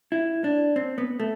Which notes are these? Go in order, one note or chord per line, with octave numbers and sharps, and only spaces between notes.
E4
D4
C4
B3
A3